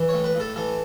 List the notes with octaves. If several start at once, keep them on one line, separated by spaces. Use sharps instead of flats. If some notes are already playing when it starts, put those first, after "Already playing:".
Already playing: E3
A2 C#5
B4
A2 A4
E3 A4